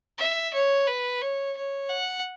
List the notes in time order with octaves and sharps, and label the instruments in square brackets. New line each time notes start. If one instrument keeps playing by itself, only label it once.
[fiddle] E5
C#5
B4
C#5
C#5
F#5